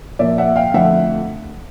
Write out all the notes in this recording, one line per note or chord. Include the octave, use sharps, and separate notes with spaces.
A#2 F3 A#3 D5 E5
E5 F#5
F5 G5
F2 D3 F3 A3 E5 F#5